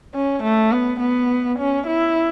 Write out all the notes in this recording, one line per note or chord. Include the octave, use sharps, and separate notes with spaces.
C#4
A3
B3
B3
C#4
E4